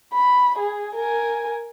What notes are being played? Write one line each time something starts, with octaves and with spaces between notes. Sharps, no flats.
B5
G#4
A#4 G#5